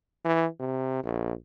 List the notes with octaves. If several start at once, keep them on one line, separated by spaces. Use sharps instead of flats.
E3
C3
A#1